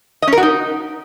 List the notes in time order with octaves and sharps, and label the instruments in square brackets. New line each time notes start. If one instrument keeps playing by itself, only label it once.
[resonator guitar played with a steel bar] D#5
C#4
A#4
F#4
D#4